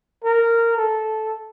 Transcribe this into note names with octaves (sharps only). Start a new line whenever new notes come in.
A#4
A4